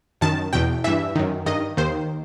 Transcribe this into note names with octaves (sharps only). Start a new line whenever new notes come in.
F#2 D#3 A5
E2 B2 G5
G2 E3 E5
F#2 D#3
G2 D#3 D#5
D#2 D#3 C5